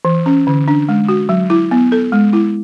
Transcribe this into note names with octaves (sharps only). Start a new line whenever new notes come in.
E3
C#4
D3
D4
G#3
F#4
F#3
E4
B3
A4
G#3
E4